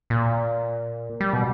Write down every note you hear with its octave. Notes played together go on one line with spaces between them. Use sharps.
A#2
G3
B2